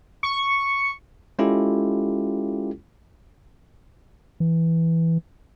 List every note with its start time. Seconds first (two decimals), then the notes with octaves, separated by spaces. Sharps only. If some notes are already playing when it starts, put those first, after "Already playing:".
0.23 C#6
1.39 G#3 C#4 E4 F4 G4 A4
4.40 E3